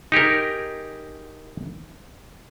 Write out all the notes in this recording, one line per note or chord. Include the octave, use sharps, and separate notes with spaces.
D#4 G4 G#4 A#4